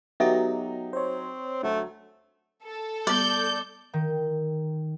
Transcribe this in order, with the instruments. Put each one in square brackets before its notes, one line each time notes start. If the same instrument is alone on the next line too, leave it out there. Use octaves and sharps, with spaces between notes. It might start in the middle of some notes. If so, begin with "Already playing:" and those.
[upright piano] F#3 D#4 [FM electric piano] B3 F#4 G4 [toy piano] A4 D#5 E5
[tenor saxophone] C4 [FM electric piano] C5 C#5
[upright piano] D2 F#3 [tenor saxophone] A3
[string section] A4
[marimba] G3 B3 [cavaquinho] D5 [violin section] G6
[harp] D#3